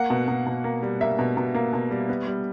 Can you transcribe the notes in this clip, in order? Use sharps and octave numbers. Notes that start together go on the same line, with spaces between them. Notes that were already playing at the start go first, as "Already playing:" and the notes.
Already playing: A#3 F#5
B2
B2
B2
A#3
G3
A#3 E5
B2
B2
A#3
B2
G3
B3
G3